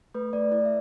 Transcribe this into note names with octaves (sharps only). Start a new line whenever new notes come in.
A3 B4
A3 D5
E4 D5
E5